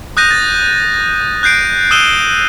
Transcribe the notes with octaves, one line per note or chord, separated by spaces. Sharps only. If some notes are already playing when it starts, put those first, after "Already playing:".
D#6 F#6 G6 A#6 D#7
A6
F#6 G6 C7 D7
D#6 E6 D#7 E7 G7